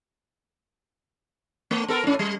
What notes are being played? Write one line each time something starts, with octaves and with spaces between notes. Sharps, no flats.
A3
B3 A4 A#4
A2 C#4
G3